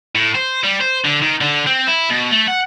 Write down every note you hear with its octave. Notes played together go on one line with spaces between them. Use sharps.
A2
C5
G3
C5
D3
D#3
D3
C4
E4
B2
A3
F#5